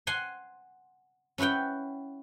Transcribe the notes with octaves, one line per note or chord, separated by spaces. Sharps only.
F#5 G#5 C6
C#4 E4 B4 F#5 G5